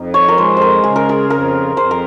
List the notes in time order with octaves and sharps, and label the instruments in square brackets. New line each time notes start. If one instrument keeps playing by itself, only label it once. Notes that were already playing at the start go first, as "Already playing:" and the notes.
Already playing: [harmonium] F2 [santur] D#4
[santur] C#5
A#4
[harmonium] G#3 [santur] C5
[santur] A#4 C5
[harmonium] C#3 [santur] G#4
[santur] A#4
G#4
[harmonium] F2 [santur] A#4
[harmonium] F2 [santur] C5
[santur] A#4